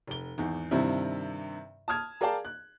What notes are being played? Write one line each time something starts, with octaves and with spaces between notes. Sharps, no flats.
F1 G7
G#1 E2
G2 C3 D#3 C4 E4
A5 D#6 F6 G#6
G#4 A#4 D5 F5 G5 A5
F#6